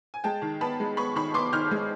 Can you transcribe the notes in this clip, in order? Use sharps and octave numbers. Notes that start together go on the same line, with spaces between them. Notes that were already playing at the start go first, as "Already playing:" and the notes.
G#5
G#3 G5 A5
D#3
B3 A5 B5
G#3
B3 B5 C#6
D#3 B5 C#6
B3 C6 D6
D#3 F6 G6
G#3